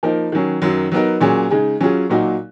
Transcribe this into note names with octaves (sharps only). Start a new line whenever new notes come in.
F3 A#3 D#4 A#4
D#3 F#3 C#4
F#2 D#3 F#3
F#3 B3 D#4 A#4
A#2 F#3 C#4 G#4
C#3 G#3 D#4 G#4
F#3 C#4 F4 G#4
A#2 F#3 A#3 D#4 F#4